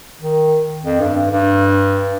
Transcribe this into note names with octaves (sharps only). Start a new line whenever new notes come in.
D#3
F2
G2
G2
G2